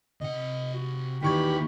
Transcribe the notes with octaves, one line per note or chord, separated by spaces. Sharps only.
C3 D#5 F#5
F#4
D#2 D#3 E3 G4 D5 B5 C#6 G#6